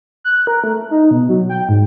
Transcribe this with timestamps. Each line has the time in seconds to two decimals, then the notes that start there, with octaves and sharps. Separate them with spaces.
0.24 F#6
0.47 A#4
0.64 A3
0.91 D#4
1.11 B2
1.29 F#3
1.49 G5
1.69 G#2